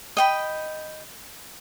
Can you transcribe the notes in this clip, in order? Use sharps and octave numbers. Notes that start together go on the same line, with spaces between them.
D#5 G5 B5